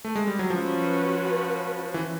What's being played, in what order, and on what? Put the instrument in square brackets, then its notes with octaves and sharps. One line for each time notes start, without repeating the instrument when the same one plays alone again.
[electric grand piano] A3
G#3
G3
F#3
[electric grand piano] F3 [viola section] C#4 F#4 B4
[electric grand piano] E3